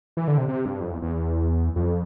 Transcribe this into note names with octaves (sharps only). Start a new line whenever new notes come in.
E3
D3
C3
C3
G2
F2
E2
E2
F2